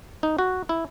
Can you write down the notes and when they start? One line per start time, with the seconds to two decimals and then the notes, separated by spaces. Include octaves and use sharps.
0.23 D#4
0.39 F#4
0.69 E4